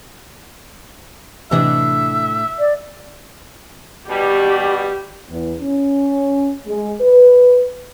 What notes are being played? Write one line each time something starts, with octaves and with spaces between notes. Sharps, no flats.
A2 C3 E3 D4 D#5 E5
D5
B2 G3 G4
E2
C#4
G#3
B4